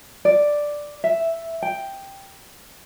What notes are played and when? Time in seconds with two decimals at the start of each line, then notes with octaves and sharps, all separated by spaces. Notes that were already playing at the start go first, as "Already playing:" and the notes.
0.25 D5
1.04 E5
1.63 G5